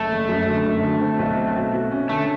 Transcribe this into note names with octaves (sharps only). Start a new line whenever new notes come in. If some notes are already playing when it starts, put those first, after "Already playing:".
Already playing: F#1 A3
F#1
F#2
D3
F#2
D3
C4
B1
C4
B2
F#4
C#4
D3 A3